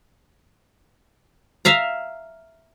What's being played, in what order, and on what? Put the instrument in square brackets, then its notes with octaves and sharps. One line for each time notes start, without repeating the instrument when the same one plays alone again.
[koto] E5 F5 A#5